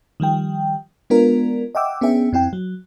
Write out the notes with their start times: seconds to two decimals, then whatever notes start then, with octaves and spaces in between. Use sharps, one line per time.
0.20 D#3 F3 G3 G5
1.10 G#3 B3 D4 F4 A#4
1.75 D#5 E5 F#5 G5 D6 E6
2.01 B3 C#4 D4 G#4 E5 G5
2.33 F2 C4 E4 G5
2.53 F#3